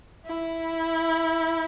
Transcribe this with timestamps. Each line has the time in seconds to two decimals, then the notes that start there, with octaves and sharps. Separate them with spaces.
0.25 E4